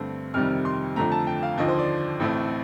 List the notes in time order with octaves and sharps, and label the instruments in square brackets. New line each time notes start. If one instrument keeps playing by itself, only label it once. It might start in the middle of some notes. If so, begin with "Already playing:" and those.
Already playing: [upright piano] G2 D3 A3 C4
F2 C3 D#3 G3 F6
C6
F2 D3 F3 A3 A#5
A5
G5
F5
D#2 D3 F3 D#5
C5
D5
A1 A2 A3 C4